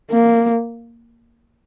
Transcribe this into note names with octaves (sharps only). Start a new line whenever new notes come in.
A#3